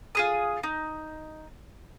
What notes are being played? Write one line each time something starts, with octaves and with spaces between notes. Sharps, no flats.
F4 G#4 D#6
D#4